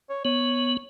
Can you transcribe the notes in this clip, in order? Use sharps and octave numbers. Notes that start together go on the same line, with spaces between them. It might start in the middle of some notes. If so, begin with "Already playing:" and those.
C#5
B3 C#5